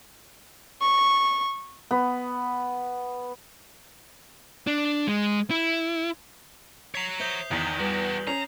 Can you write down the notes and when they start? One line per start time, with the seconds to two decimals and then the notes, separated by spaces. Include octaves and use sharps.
0.81 C#6
1.91 B3
4.67 D4
5.07 G#3
5.50 E4
6.95 C#5 A#5 B6 C7 F7
7.19 C5 E5 D#6 G6 G7
7.51 E2 D#3 B6 F#7
7.79 G3 F#4 G4 B4
8.27 C#4 A#5 C7